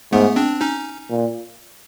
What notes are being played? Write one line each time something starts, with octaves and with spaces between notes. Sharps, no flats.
G#2 A3 B3
C4 D4
C#4 D#4
A#2